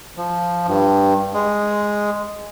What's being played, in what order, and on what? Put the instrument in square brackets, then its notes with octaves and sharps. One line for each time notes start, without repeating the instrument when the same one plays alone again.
[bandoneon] F3
G2
G#3